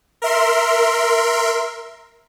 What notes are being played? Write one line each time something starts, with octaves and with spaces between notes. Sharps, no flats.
A#4 E5 C6